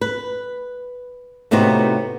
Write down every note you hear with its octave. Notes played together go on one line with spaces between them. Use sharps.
B4
A2 C3 B3 C4 D#4 F#4